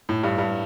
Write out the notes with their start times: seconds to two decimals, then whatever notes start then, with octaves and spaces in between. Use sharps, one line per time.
0.09 A2
0.23 G2
0.38 G2